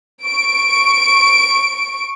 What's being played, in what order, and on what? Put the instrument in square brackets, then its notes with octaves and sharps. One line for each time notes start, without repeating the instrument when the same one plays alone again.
[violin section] C#6 D7